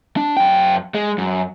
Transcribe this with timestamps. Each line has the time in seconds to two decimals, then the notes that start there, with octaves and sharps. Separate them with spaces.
0.17 D4
0.37 F#2 G5
0.95 G#3
1.18 F#2